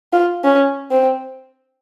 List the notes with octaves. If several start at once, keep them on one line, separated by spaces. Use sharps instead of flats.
F4
C#4
C4